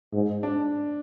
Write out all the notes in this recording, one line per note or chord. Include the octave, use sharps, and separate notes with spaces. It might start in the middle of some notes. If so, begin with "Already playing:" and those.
G#2
D4